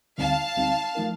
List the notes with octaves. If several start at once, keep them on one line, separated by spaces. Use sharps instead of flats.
D2 D3 G3 C4 D#4 F5 A5
D2 D3 G3 C4 D#4
F3 A3 D#4 A#4